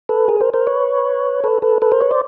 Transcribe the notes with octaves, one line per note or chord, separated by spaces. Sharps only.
A4 B4
G#4 A#4
A#4 C5
A#4 C5
B4 C#5
A4 B4
A4 B4
A4 B4
A#4 C5
B4 C#5
C5 D5